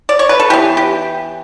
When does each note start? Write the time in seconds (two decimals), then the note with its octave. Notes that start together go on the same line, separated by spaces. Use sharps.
0.09 D5
0.19 C#5
0.29 B4
0.40 A4
0.50 E3 B3 G4
0.77 G4